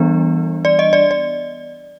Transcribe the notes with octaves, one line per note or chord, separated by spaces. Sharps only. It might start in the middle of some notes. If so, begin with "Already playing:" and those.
Already playing: E3 G3 B3 D4
D5
D#5
D5
D5